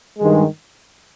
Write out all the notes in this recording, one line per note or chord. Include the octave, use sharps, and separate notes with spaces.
G2 D#3 G#3